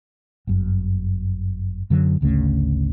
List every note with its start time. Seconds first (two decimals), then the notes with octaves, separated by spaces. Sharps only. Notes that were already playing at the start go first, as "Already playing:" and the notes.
0.47 G1 F#2
1.90 F#2 D3 F#3
2.21 G#1 D2 C#3 A3